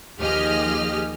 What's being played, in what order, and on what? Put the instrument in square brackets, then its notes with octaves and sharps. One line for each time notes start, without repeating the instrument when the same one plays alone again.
[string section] D#2 F3 G4 G#4 D#5 F6